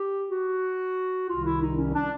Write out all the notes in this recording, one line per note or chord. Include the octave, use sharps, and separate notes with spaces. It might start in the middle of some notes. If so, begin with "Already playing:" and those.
Already playing: G4
F#4
C2 C3 D#3 F4
E4
D#4
C#4
D4